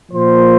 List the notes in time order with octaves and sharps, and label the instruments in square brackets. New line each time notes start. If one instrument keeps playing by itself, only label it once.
[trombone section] A#2 F3 A#3 C5